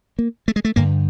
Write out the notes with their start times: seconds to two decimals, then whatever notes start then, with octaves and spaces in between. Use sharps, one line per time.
0.19 A#3
0.48 A3
0.56 G#3
0.65 A3
0.76 G2 D3 A#3